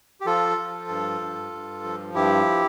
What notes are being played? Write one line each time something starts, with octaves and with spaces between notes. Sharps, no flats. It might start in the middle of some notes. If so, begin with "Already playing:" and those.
G4
F3 F4 A4
F3
G2
G2
G2
F3
G2 E4 G4